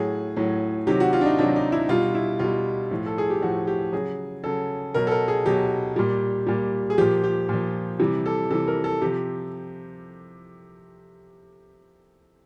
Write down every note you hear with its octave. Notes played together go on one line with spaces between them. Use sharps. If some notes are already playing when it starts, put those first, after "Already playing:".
Already playing: A2 F#3 G#4
A2 F#3
C3 D#3 F#3 G4
F#4
F4
D4
D#4
C3 D#3 F#3 D4
D#4
E4
B2 G3 F4
E4
B2 G3 F4
A2 F3
A4
G#4
G4
A2 F3 F#4
G4
C#3 F#3 G#4
C#3 F#3 A4
B2 F#3 A#4
A4
A#4
G#4
B2 F#3 G4
A#2 G3
A#2 G3
G#4
A#2 F3 G4
G4
A#2 F3
C3 E3 G3
A4
C3 E3 G3 A4
A#4
A4
C3 F3 G4